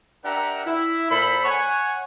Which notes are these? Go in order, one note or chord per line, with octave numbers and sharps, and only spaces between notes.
D4 G4 A#4 E5 F#5 A#5
E4
A#2 A4 A#4 C5 B5
C#5 F#5 G#5